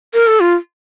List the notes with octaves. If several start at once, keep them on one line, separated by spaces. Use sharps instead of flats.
A#4
A4
F4